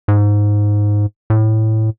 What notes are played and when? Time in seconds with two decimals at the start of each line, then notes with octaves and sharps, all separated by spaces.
0.08 G#2
1.30 A2